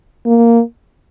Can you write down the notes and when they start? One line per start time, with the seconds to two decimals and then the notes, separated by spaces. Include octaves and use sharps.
0.26 A#3